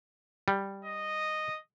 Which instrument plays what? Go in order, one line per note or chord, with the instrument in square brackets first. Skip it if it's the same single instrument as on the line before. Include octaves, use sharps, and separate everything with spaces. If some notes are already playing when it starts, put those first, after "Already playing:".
[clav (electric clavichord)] G3
[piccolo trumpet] D#5